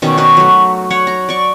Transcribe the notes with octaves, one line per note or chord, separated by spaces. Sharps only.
B2 D#3 C#4 D5
D#4 F#4 B4
F#3 A3
C#5 F#5
A#5
D5 C#6